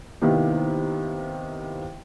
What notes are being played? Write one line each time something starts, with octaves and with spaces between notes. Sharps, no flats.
C3 D#3 A#3 B3 E4